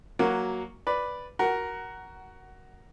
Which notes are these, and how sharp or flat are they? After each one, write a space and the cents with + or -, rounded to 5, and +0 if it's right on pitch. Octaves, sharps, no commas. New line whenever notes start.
F#3 +0 A#3 +0 F#4 -5
B4 +0 D5 +0
F#4 +10 A#4 +5 F#5 +20